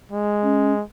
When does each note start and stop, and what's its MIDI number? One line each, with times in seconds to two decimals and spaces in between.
0.12 0.83 56
0.43 0.73 61